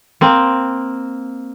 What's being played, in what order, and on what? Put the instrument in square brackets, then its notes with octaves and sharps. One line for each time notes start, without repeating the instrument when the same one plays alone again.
[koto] A#3 C4